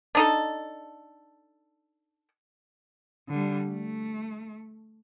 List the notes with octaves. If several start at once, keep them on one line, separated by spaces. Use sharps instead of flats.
D4 D#4 A4
D3 G3
A3